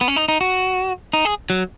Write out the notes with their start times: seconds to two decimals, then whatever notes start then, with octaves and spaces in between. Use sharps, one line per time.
0.01 B3
0.08 C#4
0.16 D#4
0.28 D#4
0.41 F#4
1.13 D#4
1.25 G#4
1.50 F#3